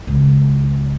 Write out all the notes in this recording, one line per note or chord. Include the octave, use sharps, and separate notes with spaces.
C#2